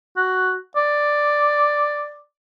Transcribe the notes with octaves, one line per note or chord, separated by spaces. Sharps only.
F#4
D5